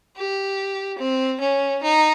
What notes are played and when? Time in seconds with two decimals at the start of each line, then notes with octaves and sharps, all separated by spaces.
0.17 G4
0.98 C4
1.40 C#4
1.82 D#4